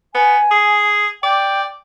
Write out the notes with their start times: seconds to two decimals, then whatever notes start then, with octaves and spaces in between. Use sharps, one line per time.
0.14 B3 G#5
0.51 G#4
1.23 D5 G5